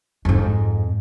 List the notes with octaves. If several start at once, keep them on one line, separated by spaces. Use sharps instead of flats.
F2 G#2